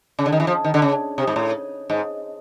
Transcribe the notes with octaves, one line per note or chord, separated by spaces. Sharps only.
C#3
D3
D#3
E3
F3
D#3
D3
C#3
C3
G#2
A2
G#2